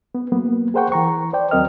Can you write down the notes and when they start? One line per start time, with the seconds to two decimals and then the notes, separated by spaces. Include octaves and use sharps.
0.15 B3
0.32 F#3 A#3 B3
0.74 G#4 A#4 C5 F#5 G5 C#6
0.92 E3 A#5 C#6
1.33 C5 D5 G5
1.51 D#2 F#3 C4 A#4 D#5 F6